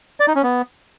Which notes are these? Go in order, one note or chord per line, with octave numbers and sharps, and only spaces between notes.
D5
D#4
C#4
B3